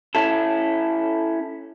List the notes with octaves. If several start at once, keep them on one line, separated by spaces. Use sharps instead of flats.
C#4 E4 A4